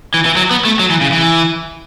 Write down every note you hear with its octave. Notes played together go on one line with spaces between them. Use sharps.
E3
E3
F#3
B3
A3
F#3
E3
C#3
E3